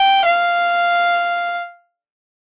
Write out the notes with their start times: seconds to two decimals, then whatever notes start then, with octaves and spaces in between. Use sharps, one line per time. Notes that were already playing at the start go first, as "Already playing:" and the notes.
Already playing: G5
0.26 F5